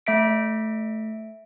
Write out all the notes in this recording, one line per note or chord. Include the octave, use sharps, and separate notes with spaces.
A3 E5 B6 D7